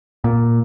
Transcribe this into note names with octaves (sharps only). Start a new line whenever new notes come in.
A#2